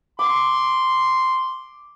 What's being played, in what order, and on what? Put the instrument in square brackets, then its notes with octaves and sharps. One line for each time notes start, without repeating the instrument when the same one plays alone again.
[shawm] C6 [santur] D6